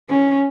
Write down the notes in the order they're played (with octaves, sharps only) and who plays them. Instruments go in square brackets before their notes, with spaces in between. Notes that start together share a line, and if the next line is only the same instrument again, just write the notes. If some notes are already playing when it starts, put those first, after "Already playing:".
[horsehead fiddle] C#4